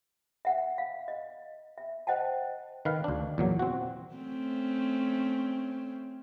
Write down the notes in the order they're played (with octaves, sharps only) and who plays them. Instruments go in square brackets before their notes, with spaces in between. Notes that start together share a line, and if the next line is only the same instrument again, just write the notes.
[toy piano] E5 F#5
F5
D#5
E5
C5 D#5 F#5 G5 A5
[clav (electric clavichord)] D#3 B4 F5
D2 D4
E2 A#2 F#3
C4 F#4
[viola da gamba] A3 C4 C#4